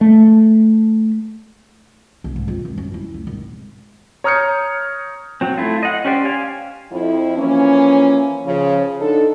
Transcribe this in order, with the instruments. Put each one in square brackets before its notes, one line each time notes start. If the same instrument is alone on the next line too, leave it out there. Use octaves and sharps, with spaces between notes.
[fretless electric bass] A3
[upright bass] B1
G#2
F2
D#3
F#2
E4
D2
G#1
[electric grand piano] C#5 A#5 D#6 F6 G6 C#7
[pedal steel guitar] F#3 C4
A3 E4 F4
D#5 F#5
C#4 G4 C5 D5
F5 G#5
[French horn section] F2 F3 E4
E3 F3 A#3 C#4
C#3 F3
D3 D4 D#4 A4